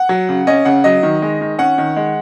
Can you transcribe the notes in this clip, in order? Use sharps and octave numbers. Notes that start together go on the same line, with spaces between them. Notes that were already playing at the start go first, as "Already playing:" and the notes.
Already playing: F#5
F#3
C#3
C#4 D#5
C#3 F#5
F#3 D#5
D#3
G#3
D#3
C#4 F#5
D#3
G#3